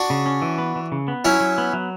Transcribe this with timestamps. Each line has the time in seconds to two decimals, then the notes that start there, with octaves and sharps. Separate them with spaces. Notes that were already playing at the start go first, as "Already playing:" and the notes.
Already playing: D4 F#4
0.10 C#3
0.26 C#4
0.42 E3
0.58 B3
0.76 E3
0.92 C#3
1.08 B3
1.25 F#3 C#4 E4
1.40 F#3
1.58 B3
1.73 F#3